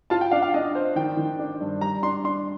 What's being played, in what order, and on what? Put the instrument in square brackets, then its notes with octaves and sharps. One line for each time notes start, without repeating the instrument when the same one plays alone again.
[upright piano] F4 [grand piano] A5
[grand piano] G5
[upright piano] D4 [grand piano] F5
[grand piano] F5
[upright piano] D4 [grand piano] D#5
[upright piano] C5
[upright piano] D#3 [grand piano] G5
[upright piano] D#3
D4
G2
[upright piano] G3 [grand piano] A#5
[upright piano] D4 [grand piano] C6
[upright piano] D4 [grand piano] C6